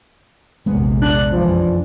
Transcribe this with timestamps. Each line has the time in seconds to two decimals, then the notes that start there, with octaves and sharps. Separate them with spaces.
0.66 A#1 E2 C3 G#3 B3
1.02 D4 F#6
1.32 F1 F#2 E3 F3